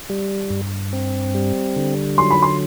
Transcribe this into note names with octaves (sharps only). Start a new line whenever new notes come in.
G3
G2
C4
G3
D3
F#3 C6
B5
C6